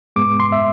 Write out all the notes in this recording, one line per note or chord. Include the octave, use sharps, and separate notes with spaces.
G#2 G#3 B3 D6
C6
E5